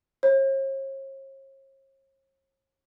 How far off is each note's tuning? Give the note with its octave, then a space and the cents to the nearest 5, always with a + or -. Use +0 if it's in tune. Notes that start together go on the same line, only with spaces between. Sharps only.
C#5 -45